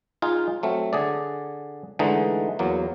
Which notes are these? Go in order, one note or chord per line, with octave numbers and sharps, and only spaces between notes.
D#4 F4 G#4
F#3 A3 C4
D3 G#4 D5
D3 E3 G#3 A3 D#4
E2 F#3 A#3